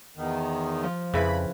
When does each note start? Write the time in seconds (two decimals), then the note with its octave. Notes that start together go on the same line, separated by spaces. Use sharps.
0.17 E2 D#3
0.83 F3
1.14 F2 C#3 E4 B4 B5